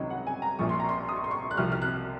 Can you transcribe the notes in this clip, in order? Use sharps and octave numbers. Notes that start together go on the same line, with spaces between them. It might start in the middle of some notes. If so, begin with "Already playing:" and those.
Already playing: C#2 C3 D#3 F#3 C#5 D#5
F#5
G#5
A#5
A#1 A#2 F3 C#6
C6
A#5
C6
D#6
C#6
C6
C#6
F#6
C2 C3 F3 F6
F6
F#6